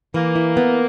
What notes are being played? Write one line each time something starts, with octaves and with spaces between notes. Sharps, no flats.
E3 A#3
E4
B3